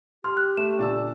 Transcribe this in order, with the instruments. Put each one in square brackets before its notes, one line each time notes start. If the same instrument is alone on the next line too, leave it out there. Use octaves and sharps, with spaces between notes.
[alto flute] G4 [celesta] C6 [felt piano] F6
[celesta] F#6
[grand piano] A3 [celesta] E7
[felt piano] A#2 D3 [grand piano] D5 A5 E6